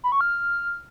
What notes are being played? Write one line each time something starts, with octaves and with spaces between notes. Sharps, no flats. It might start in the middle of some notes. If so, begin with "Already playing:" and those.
B5
C#6
F6